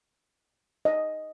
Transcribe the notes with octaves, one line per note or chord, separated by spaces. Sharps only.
D#5